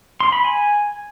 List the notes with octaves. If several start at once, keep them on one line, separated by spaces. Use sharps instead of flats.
C6
B5
G#5